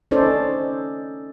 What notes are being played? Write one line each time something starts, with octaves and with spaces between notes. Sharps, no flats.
C#4 D#4 A4 C5 D5